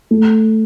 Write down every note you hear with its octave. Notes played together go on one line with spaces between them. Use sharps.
A3